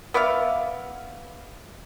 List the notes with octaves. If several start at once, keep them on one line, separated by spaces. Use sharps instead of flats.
B3 D5 E5 F5